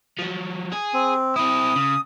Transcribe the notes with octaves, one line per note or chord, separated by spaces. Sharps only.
F3 F#3
G#4
C4
C4 E4 D#6
C#3